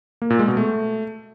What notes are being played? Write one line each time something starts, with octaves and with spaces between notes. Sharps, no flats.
A#3
A#2
G#3
B2
A3